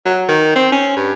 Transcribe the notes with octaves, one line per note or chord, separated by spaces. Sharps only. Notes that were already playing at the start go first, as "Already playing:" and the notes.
F#3
D#3
C4
C#4
G2